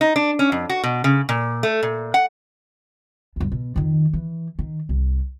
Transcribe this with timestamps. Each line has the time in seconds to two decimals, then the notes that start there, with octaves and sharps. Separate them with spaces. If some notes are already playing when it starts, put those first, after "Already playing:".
0.01 D#4
0.16 D4
0.39 C#4
0.52 F2
0.69 F#4
0.83 B2
1.04 C#3
1.29 A#2
1.63 A3
1.83 A#2
2.14 F#5
3.36 D2 G2
3.52 B2
3.76 F2 D#3
4.13 E3
4.59 D#3
4.89 C2